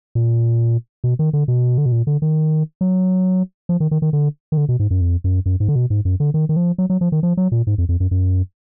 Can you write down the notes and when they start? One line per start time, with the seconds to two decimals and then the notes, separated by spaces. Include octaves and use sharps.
0.15 A#2
1.04 B2
1.19 D#3
1.33 D3
1.48 B2
1.78 D3
1.86 B2
1.92 A#2
2.07 D3
2.22 D#3
2.81 F#3
3.69 F3
3.80 D#3
3.91 D#3
4.02 D#3
4.13 D3
4.52 D#3
4.57 D3
4.69 B2
4.80 G#2
4.91 F#2
5.01 F2
5.24 F#2
5.46 F#2
5.60 G#2
5.68 D3
5.76 B2
5.90 G#2
6.05 F#2
6.20 D3
6.34 D#3
6.49 D#3
6.56 F3
6.78 F#3
6.90 F#3
7.01 F3
7.12 D#3
7.23 F3
7.37 F#3
7.52 A#2
7.67 G#2
7.78 F2
7.89 F2
8.00 F#2
8.11 F#2